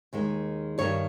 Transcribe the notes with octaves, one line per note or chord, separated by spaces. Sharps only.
D#2 D#3 G#3
G2 D#3 G3 C#5